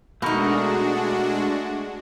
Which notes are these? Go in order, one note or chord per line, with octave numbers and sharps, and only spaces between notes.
B2 G#3 A3 D4 D#4 F#4 A#4 C#6